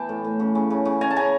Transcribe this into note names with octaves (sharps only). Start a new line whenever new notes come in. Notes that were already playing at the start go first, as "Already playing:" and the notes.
Already playing: E3 B3 G5 A5
A2
A2
C#3
C#3
C#3
C#3
C#3 G#5 A#5
A5
C#3 G#5 A#5